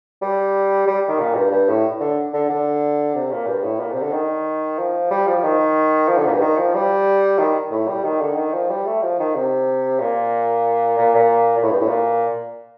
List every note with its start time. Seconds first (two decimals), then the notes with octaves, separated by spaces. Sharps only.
0.22 G3
0.87 G3
1.09 D#3
1.20 A#2
1.35 G2
1.51 G2
1.69 A2
2.01 D3
2.34 D3
2.49 D3
3.15 C3
3.32 A#2
3.47 G2
3.64 A2
3.80 A#2
3.92 C3
4.02 D3
4.13 D#3
4.78 F3
5.11 G3
5.27 F3
5.38 F3
5.44 D#3
6.08 F3
6.18 D3
6.26 A#2
6.33 G2
6.41 D#3
6.58 F3
6.75 G3
7.39 D#3
7.71 A2
7.88 G3
8.04 D#3
8.21 D3
8.37 D#3
8.54 F3
8.70 G3
8.86 A3
9.02 F3
9.19 D#3
9.36 C3
10.00 A#2
10.98 A#2
11.15 A#2
11.57 A#2
11.63 A2
11.71 G2
11.81 A2
11.88 A#2